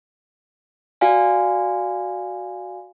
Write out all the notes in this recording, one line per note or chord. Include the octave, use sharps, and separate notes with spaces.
F#4 D5 F5 G#5